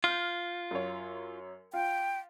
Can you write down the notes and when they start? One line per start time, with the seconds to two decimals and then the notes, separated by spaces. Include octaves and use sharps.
0.04 F4 F6 G6
0.71 F#2 C#5
1.73 F4 G5